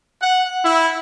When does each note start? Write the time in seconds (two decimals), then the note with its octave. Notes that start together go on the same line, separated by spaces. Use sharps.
0.22 F#5
0.64 E4